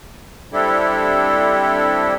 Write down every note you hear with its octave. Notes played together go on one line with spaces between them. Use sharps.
G3 C4 D4 E4 G4 A4